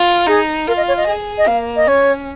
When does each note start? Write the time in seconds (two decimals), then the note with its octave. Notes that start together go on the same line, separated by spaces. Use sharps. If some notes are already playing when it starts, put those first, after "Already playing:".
Already playing: F4
0.27 D#4 G#4
0.68 F4 A#4
0.77 D#5
0.88 C#5
0.97 D#5
1.07 G#4
1.38 D#5
1.47 A#3 F5
1.76 D#5
1.87 C#4 C#5